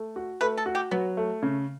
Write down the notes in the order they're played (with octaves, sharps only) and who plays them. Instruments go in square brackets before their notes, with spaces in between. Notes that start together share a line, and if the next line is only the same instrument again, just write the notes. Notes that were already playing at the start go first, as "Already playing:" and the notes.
Already playing: [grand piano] A3
F#4
[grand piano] A3 [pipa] B4
[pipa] A4
[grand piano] F#4
[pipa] G4
[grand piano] F#3 [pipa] B3
[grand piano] A3
C#3